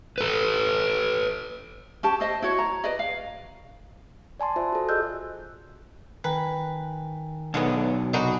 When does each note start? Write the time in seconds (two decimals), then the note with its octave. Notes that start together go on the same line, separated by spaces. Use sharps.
0.18 A4 B4
2.03 C#4 G4 A5
2.20 C5 D#5 E5
2.42 E4 F#4 C#5
2.59 A#5
2.84 B4 D5 D#5
2.99 F5
4.40 D5 G#5 A5 C6
4.56 F4 C5 E5
4.72 F#4 A4
4.89 G#4 D5 D#5 E6 F#6 G6
6.24 D#3 B4 G5 G#5 A#5
7.54 B1 D3 G#3 B3
8.13 C3 D4 D#4 F#4 G#5 B5 D#6